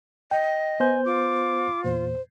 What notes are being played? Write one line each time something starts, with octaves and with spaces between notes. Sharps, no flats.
D#5 G5
B3 C5 G#5 G6
F4 D6
E2 A#2 C5